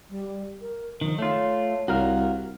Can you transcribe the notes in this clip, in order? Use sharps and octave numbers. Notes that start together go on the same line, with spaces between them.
G3
A#4
D#3 F3
A3 F4 C#5
C2 F#4 A#4 F5